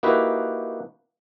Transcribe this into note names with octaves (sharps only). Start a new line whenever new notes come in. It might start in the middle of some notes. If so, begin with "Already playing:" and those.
A#3 D#4 E4 F#4 G4 B4